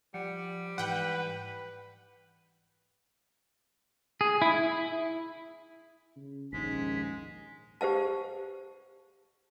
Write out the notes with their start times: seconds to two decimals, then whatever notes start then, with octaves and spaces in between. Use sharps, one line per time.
0.14 F3 G3 F#5 C#7
0.78 G#2 E3 B4 F#5 G5
4.21 G#4
4.42 E4
4.54 E4
6.16 C#3
6.53 A#1 D#2 G#2 G#3 C#4 B6
7.81 G4 C5 F5 A5